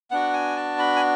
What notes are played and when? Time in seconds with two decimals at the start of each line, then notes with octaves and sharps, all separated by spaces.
0.11 B3 D4 F#4 F#5
0.33 G#5
0.56 A5
0.79 B5
0.96 G#5